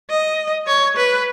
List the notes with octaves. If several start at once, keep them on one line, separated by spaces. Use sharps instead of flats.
D#5
C#5
B4